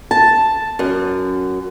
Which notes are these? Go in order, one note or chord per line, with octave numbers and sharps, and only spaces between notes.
A5
F#2